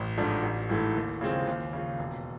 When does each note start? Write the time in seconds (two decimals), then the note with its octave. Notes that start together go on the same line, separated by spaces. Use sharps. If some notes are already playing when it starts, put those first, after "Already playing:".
Already playing: A1
0.18 G#2 F3 A3 D4
0.43 A1
0.69 G#2 E3 A3
0.95 D#2
1.21 C#3 F3 G#3 C4
1.47 D#2
1.73 C#3 F3
1.99 E1